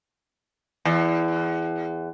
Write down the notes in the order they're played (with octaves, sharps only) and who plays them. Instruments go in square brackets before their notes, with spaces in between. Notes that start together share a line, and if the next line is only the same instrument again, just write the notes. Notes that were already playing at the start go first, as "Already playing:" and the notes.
[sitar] E2